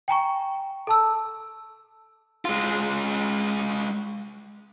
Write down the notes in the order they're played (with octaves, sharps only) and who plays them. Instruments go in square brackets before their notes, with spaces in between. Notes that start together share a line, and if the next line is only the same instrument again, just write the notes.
[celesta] G5 G#5 A#5 C#6
A4 A5 E6
[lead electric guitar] G#3 F4